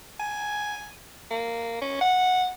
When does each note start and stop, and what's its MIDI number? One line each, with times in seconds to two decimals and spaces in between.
0.20 0.94 80
1.31 1.78 58
1.82 1.98 61
2.01 2.49 78